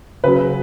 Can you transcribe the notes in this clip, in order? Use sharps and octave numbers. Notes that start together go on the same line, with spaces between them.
C#3 F#3 B4